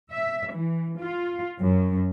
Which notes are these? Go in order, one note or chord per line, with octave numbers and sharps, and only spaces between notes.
E5
E3
F4
F#2